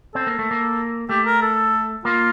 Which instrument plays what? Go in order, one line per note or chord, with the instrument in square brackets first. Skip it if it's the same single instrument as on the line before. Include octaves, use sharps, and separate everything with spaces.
[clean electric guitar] C4 [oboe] A4
[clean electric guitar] A#3
A3
A#3
[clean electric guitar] A3 [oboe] G4
[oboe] A#4
A4
[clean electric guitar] A#3 [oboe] F4